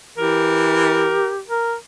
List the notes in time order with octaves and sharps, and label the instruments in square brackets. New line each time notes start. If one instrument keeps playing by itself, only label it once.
[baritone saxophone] E3 [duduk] G4 [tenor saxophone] A#4
[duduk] A#4